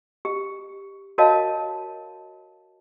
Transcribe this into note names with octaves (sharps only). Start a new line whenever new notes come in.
G4
F#4 A#4 C#5 D#5 F5 A5